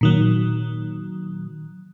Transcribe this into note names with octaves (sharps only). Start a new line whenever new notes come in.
A#2 D#3 F#3